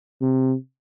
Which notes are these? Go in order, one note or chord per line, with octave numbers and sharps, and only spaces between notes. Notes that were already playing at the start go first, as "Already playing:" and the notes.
C3